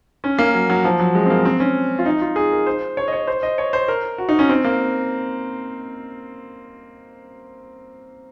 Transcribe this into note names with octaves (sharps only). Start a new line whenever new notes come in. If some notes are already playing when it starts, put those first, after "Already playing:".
C#4
A#3
F#3
F#3
F3
F#3
G#3
C4
A#3
C4
C#4
F4
D#4
F4
G#4
A#4
C5
C#5
D#5
C#5
C5
D#5
C#5
C5
A#4
F#4
D#4
C#4
C4
A#3